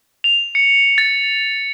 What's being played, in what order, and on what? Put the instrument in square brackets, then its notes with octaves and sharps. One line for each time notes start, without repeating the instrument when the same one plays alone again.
[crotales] F7
C#7
A6